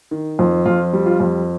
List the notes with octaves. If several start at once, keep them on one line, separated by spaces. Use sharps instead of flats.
D#3
F2
F2 F4
G3
F4
F2